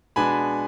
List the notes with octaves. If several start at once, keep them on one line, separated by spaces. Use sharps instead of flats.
B2 G#3 B3 D4 G#5 B5